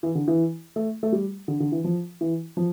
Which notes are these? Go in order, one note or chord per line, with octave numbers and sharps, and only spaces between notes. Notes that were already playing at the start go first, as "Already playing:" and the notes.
E3
D3
E3
A3
A3
G3
D3
D3
E3
F3
E3
F3